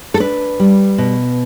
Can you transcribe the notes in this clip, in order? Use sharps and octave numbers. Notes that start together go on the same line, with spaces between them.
A4
D4 B4
G3
B2